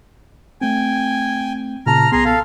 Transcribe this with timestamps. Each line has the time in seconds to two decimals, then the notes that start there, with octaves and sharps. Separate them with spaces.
0.61 A3 C4 G5 G#5
1.86 A#2 C#3 A5 A#5 F6
2.12 B1 B3 G#4 A#5 C6
2.25 A4 F5